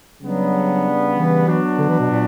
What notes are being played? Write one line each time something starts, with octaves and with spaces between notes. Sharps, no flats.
C#3 F#3 G3 B3 D4
E3
F#3 B3 D4 F#4
D3
E3
B2
A#2